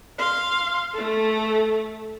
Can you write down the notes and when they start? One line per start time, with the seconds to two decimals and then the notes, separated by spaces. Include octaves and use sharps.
0.18 F5 C6
0.94 A3 A4